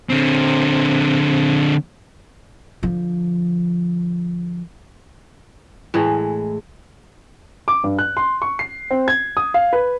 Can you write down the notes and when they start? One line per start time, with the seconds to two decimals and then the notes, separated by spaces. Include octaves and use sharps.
0.09 D3 C4
2.83 D3 F3
5.94 A2 E3 G#3
7.68 D6
7.84 G2
7.99 F#6
8.17 C6
8.42 C#6
8.59 C7
8.91 C4
9.08 G#6
9.37 D#6
9.54 F5
9.73 B4